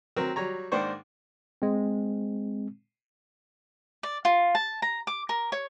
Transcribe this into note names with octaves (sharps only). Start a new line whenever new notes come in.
F#3 C4 A#4
F#3 G3 C#5 A#5
G#2 D#3 A#3 D4 C5 C#6
G#3 C4
D5
F4
A5
A#5
D6
A#4
C#5